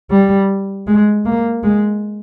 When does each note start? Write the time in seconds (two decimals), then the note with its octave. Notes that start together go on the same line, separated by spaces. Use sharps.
0.11 G3
0.87 G#3
1.26 A#3
1.63 G#3